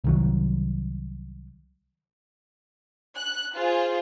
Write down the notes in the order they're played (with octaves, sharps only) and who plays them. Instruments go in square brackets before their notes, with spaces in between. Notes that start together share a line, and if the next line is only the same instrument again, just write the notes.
[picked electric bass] C2 D#3 F#3
[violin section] F#6
F4 G#4 C5